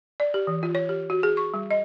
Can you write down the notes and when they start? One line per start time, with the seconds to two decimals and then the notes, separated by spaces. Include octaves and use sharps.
0.20 D5
0.34 G4
0.47 E3
0.63 F4
0.75 C#5
0.89 G4
1.10 F#4
1.23 G#4
1.37 C#6
1.54 G3
1.70 D#5